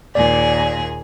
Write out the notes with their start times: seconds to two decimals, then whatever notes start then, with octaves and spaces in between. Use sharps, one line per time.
0.15 D#2 A#2 G#4 D5